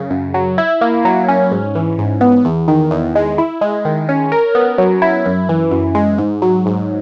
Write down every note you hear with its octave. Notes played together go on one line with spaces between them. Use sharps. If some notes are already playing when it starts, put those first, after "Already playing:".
Already playing: F#2 C#3
F#2
F#3
E4
A#3
F#3
C#4
G#2
E3
G#2
B3
E2
D#3
E2
G#3
E4
G#3
D#3
C#4
A#4
B3
F#3
E4
F#2
E3
F#2
G#3
G#2
F#3
G#2